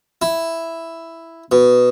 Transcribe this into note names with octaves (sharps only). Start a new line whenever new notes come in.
E4
B2